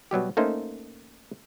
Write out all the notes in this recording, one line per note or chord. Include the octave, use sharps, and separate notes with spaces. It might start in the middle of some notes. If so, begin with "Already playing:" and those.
B2 F#3 G3 G4
A3 A#3 C#4 D#4 C5